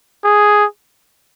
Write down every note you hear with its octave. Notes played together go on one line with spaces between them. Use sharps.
G#4